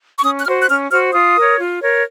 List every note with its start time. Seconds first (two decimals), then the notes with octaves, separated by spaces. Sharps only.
0.18 C#6
0.23 C#4 D#6
0.39 F#6
0.45 F#4 C5 F6
0.61 F#6
0.68 C#4 F6
0.91 F#4 C5 F6
1.13 F4 D#6
1.36 A#4 C#5
1.59 F4
1.81 A#4 C#5